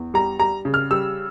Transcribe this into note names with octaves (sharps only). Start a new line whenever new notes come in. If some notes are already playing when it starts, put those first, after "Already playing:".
Already playing: E2
G3 A#5
G3 A#5
C#3
F6
G3 E6